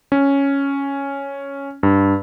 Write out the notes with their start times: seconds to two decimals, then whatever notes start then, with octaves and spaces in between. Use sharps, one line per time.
0.12 C#4
1.83 G2